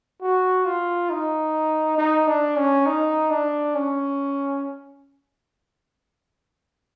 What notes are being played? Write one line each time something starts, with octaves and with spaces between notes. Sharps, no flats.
F#4
F4
D#4
D#4
D4
C#4
D#4
D4
C#4